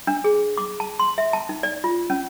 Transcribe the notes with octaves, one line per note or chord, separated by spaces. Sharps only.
D4
G#4
D6
A5
C6
E5
A5
D#4
D5
F4
C#4